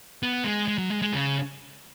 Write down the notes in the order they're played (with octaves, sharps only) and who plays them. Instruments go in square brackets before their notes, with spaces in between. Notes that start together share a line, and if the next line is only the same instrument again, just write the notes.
[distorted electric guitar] B3
G#3
G#3
F#3
G#3
G#3
C#3